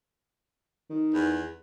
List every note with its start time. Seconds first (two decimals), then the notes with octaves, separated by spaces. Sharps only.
0.90 D#3
1.14 E2